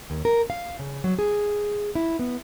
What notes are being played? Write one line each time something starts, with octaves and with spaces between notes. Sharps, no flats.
D#2
A#4
F5
C#3
F#3
G#4
E4
B3